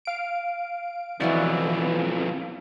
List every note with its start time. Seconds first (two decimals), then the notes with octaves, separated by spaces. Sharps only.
0.05 F5 D7
1.20 B1 F2 E3 E4 F#4 D5